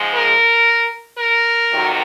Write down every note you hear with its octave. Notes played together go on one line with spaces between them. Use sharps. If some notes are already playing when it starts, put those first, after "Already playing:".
Already playing: G#2 F3 G#3
A#4
A#4
F2 C3 D#3 F#3